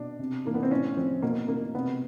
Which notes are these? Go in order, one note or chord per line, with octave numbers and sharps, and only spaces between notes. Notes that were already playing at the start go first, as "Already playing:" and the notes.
Already playing: B2 D4
C3
E3 A#3
B3
C4
A2 C#4
F3 C4
B2 A#3
B2 A#3
C3 B3